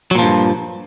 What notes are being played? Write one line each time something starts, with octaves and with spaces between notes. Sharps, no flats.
G2 A#2 F3 F#3